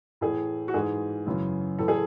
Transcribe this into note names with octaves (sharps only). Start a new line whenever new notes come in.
A2 E3 G#4
F#4
G#2 E3 G#4
F#2 C#3 E3
A2 E3 A4
G#4